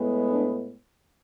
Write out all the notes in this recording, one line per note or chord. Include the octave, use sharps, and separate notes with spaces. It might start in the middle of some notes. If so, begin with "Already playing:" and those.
Already playing: A2 G#3 B3
D4